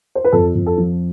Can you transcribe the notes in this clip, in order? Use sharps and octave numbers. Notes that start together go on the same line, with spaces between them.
C5
B4
F2 A4
F2
A4
F3